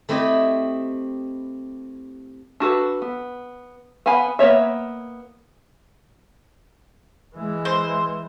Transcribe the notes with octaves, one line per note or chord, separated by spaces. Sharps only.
A3 C4 E4 G4 D#5
D4 F#4 A4 B4
B3
B3 F5 F#5 G#5 B5
A#3 B3 C#5 E5
E3 G#3
C5